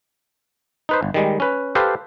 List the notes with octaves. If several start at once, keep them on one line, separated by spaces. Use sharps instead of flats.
D#4 B4 C5
G1
D#3 G3 G#3
C#4 B4
G4 A4 B4 C5 F5